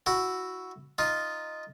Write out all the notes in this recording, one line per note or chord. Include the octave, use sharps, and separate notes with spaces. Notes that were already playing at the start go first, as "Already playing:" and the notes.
E4 F#4
D#4 F4